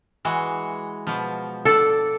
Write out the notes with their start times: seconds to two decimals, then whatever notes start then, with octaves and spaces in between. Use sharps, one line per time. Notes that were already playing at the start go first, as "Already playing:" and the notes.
0.25 E3 G#3 F#4
1.07 B2 F3
1.65 D4 A4 D5